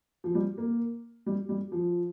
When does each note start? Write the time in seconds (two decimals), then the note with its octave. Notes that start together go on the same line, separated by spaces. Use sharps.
0.24 F3
0.35 G3
0.58 A#3
1.26 G3
1.49 G3
1.72 F3